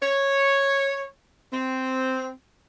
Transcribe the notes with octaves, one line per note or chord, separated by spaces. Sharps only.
C#5
C4